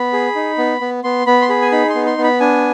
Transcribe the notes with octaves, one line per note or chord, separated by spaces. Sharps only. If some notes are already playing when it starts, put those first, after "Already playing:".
Already playing: B3 B5
G#4
D#4
B3
B3
B3 C6
B3 B5
C6
G#4 B5
G#5
D#4 B5
C6
B3
C6
B3
B5
D4 G#5